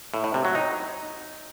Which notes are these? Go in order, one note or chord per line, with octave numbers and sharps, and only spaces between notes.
A2
A2
C3
F#3
D#4